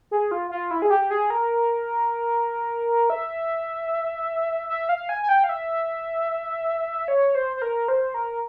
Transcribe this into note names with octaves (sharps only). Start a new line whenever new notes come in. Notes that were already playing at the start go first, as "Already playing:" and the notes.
G#4
F4
F4
E4
G#4
G4
G#4
A#4
E5
E5
F5
G#5
G#5
G5
F5
E5
C#5
C5
C5
A#4
C5
A#4